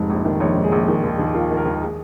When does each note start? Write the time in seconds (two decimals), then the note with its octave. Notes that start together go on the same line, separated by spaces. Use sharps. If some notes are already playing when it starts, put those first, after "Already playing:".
Already playing: F1 G#2
0.10 A#1
0.25 D#3
0.40 A#1 C#5
0.56 G#2
0.64 G#4
0.72 A#1
0.88 D#3
1.04 D#2
1.19 D#2
1.34 D#3 F4
1.50 D#3
1.57 A#4
1.65 D#2
1.75 A#4
1.81 G#4